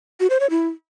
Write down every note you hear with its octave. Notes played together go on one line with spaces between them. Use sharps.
F#4
C5
C#5
E4